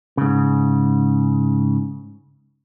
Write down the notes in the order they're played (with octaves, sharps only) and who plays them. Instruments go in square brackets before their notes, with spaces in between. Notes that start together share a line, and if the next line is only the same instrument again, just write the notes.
[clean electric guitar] G#2 C#3